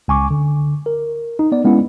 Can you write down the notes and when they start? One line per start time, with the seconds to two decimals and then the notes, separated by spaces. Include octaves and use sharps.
0.08 C#2 G#5 C#6 D6
0.30 D3
0.86 A#4
1.39 D#4
1.52 B3 D5
1.65 G#3 B3 C#4 E4